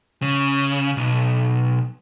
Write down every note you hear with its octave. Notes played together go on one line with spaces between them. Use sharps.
C#3
B1